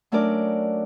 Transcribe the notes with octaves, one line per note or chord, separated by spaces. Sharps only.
F#3 A3 C#4 D4 A#4 D5